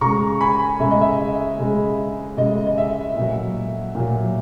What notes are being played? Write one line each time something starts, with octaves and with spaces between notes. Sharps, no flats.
C#3 G#3 A#5 C#6
G#5 B5
C#3 G#3 E5
D#5
E5
C#3 G#3
C#3 G#3 D#5
D#5
E5
A#2 F#3
A#2 F#3